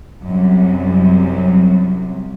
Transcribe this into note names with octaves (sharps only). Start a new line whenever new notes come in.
C2 F#2